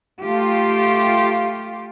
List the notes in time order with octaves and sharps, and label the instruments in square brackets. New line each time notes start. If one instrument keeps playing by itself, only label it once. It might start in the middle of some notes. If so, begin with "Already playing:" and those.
[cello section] A3 F4 G4